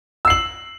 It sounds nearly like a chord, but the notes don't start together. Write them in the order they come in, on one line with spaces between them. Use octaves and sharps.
E6 C7 F#7